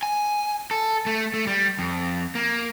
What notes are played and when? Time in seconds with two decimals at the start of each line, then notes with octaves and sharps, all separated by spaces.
0.03 G#5
0.71 A4
1.06 A3
1.34 A3
1.47 G3
1.79 F2
2.35 A#3